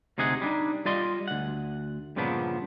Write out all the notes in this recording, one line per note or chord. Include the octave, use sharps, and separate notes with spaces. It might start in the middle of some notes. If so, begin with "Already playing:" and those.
D2 C3 D#4 G#4 F#5
G3 D4 D#4
G3 F4 D5 D#5 C6
D2 F#5
G2 A#2 C#3 F3 B3 D4